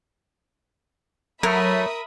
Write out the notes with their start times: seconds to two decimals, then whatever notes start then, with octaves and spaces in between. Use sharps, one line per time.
1.43 F#3 A3 A#4 E5 B5 D#6